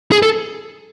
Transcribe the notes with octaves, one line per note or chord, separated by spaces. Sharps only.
G#4
A4